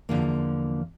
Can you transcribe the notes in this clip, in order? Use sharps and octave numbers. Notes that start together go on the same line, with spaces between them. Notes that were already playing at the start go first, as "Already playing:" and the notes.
E2 D3 F3 A#3